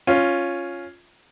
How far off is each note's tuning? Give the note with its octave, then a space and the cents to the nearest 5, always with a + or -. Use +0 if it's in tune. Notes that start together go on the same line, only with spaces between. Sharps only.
C#4 +0 F4 +0